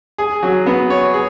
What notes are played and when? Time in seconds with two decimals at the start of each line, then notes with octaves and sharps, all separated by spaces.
0.18 G#4
0.43 F#3
0.66 B3
0.90 C#5
1.14 G#4